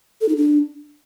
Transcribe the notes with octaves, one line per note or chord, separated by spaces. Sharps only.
A4
D#4
D4